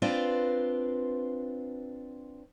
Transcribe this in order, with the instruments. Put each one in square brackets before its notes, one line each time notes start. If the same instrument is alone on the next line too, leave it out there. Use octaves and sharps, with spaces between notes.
[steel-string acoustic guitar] C4 D4 F4 B4 C5